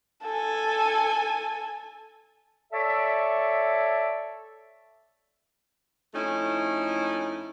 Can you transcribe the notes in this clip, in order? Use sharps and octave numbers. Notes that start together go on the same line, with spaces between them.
A4 G#5
A4 C#5 D5 E5
F2 A3 C#4 D#4 E4